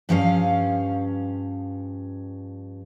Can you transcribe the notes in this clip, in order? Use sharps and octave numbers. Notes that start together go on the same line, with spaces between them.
G2 F3 C#4 F5